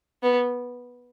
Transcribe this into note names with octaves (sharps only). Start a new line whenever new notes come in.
B3